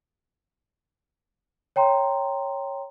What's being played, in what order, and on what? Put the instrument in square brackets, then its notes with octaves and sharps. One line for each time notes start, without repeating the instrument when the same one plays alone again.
[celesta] C#5 G5 A#5 C6